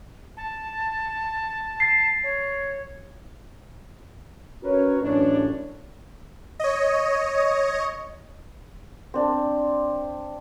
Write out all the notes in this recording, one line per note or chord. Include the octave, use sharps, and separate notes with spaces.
A5
A6 C7
C#5
C#4 F#4 A#4 B4 C#5
A1 F#2 D4 C#5
C#5 D#5
C4 D4